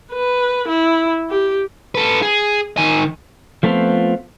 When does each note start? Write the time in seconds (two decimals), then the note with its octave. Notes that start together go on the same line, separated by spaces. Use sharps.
0.13 B4
0.68 E4
1.29 G4
1.95 A4 B4
2.22 G#4
2.77 D#3 G#5
3.63 F3 A3 B3 C4 F4